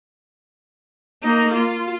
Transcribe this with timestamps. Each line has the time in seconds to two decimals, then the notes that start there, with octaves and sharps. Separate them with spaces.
1.23 A#3 D#4
1.54 F4